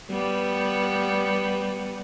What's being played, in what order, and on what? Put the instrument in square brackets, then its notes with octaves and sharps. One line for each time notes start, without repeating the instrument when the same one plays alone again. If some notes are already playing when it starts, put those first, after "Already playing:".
[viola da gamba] G3 B3